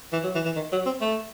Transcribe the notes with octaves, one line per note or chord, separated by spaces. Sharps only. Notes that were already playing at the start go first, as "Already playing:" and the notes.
E3
F#3
E3
E3
D#3
F#3
C4
A3